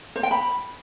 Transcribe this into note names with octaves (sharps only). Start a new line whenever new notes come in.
C5
G5
B5